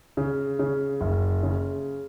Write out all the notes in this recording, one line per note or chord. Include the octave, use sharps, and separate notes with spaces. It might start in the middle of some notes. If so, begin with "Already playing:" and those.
C#3
C#3
F#1
C#3